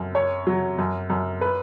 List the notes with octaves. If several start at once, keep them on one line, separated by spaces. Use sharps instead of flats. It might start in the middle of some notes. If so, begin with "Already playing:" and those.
Already playing: F#2
C#5
F#3
F#2
F#2
B4